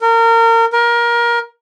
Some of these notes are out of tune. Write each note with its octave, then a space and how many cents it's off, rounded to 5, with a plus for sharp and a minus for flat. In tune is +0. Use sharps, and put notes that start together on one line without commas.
A#4 -30
A#4 +20